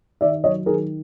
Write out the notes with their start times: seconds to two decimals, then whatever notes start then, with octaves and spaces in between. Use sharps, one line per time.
0.21 D#3 D5 E5
0.44 F#3 C#5 D#5
0.66 D#3 G#4 A#4